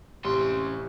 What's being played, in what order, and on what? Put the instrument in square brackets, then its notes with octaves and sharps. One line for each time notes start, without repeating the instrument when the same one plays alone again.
[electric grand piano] A1 C3 [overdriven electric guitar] C#4 C6 [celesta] G4